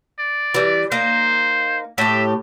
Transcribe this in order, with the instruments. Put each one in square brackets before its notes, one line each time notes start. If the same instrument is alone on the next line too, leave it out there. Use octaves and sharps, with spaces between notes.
[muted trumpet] D5
[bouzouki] E3 G3
[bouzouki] A#3 D#4 [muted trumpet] C5
[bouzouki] A2 G4 [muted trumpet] E5